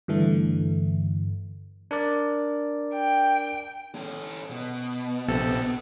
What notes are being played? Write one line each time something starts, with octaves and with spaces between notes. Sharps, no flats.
G2 D3 E3 A3
D4 A#4 D5
G5
C#4 A4
B2
A#1 C3 A4